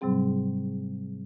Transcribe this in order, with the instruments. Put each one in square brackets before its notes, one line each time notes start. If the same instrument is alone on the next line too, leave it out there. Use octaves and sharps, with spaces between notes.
[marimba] G#2 C3 F#3 G3 C4 G#4